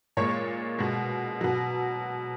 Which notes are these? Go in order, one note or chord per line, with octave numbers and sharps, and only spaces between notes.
A#2 G#3 C#5
B2 G#3
B2 F#3